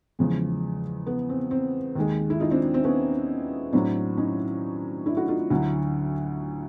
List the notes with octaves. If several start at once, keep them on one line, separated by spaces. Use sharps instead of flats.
E2 C#3 F3 G#3
B3
C4
C4
D#2 D#3 G#3
E4
D#4 F4
C4 D4
C4
B3 C#4
A2 F#3 C4 D4
C#4 D#4
D4 E4
E4 F#4
D#4 F4
D2 D3 F#3 E4 F#4